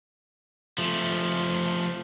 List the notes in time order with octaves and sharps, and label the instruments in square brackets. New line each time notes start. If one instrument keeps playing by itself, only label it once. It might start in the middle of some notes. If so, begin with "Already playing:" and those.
[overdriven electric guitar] F3 A3